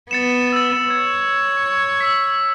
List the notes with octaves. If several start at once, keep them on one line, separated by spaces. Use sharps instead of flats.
B3 A6 C#7 E7
E6 A6
C#5 G#6
E6 B6